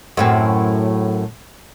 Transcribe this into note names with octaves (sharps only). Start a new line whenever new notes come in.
F#2 A2 C4